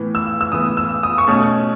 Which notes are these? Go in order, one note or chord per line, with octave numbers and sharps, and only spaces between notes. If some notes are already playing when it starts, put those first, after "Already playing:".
Already playing: A2 E3 B3
E6
E6
A2 E3 B3 D#6
E6
D#6
C#6
B2 A3 C#4 D#6